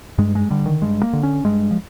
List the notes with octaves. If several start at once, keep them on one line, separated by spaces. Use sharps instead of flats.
G2 G#3
G#3
D3 G3
D#3
G2 G#3
A#3
D3
C#4
G2 G#3
F3